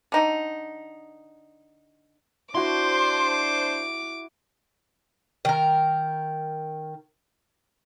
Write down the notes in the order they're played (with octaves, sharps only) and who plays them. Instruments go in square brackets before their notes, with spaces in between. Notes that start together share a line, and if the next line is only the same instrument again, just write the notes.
[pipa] D3 D#4
[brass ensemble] D4 C5 [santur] E4 F#4 [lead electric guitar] C6 [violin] D6
[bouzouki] D#3 A#4